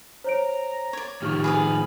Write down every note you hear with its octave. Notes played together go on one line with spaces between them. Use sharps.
C5 C#5 A#5 D7
C#5 D5
A2 D#3 F3 G4 C#6 F6
G#4 B4 B5 D#6